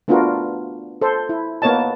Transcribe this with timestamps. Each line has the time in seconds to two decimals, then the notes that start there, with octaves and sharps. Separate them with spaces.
0.08 A3 B3 D4 F4 F#4 A#4
1.02 A4 C5
1.29 E4
1.62 A#3 B3 A#4 C#5 D#5 A5